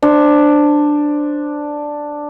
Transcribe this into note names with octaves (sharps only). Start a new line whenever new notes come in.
D4 C5